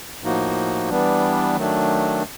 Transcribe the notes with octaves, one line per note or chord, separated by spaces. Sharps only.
A2 F3 A#3 D#4 F#4
E3 G3 B3 D4
D#3 F#3 A3 D4